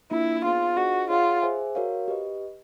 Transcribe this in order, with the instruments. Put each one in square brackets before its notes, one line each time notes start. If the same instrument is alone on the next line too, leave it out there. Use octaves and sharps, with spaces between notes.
[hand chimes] A#3 D4 F4 [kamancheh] E4
[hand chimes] B3 D#4 G#4 C5 F5 [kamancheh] F4
[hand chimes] D4 F4 G#4 C5 D#5 [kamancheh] F#4
[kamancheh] F4 [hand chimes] G#4 C#5 F#5
[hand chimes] G#4 C5 E5 G#5
F#4 A#4 C#5 F5
G4 B4 D#5